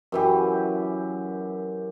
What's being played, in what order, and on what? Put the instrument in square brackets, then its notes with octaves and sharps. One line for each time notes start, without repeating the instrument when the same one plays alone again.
[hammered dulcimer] F#2 E3 G4